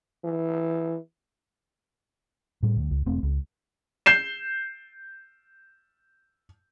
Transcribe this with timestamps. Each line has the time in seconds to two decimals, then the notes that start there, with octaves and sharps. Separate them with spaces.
0.24 E3
2.63 A2 G3
2.76 D2
2.91 C#2
3.06 E1 A3 C4
3.23 C#2
4.06 G6 C7 E7